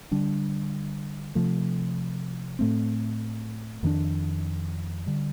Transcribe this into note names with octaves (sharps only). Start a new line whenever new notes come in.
D3 G3 D4
C3 F3 A3
A2 A3 C4
F2 D#3 A#3 D4
D3 G3